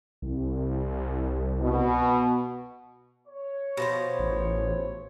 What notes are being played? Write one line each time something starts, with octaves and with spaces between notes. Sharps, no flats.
C2
B2
C#5
B2 F3 C5
A1